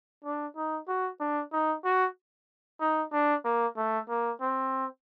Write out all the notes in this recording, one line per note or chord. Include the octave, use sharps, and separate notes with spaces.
D4
D#4
F#4
D4
D#4
F#4
D#4
D4
A#3
A3
A#3
C4